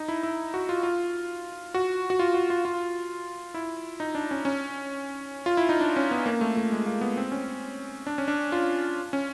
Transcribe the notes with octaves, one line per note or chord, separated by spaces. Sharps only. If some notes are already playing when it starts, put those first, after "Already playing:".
Already playing: D#4
E4
E4
F#4
F4
F4
F#4
F#4
F4
F#4
F4
F4
E4
D#4
D4
C#4
C#4
F4
E4
D#4
D4
C#4
B3
A#3
A3
A3
G#3
A#3
B3
C4
C#4
D4
C#4
D4
F4
C#4